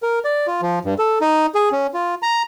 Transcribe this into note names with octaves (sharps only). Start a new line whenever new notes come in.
A#4
D5
F4
F3
G2
A4
D#4
G#4
C#4
F4
A#5